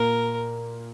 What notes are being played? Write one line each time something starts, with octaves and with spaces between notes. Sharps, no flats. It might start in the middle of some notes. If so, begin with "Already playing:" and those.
Already playing: A#2 A#3 A#4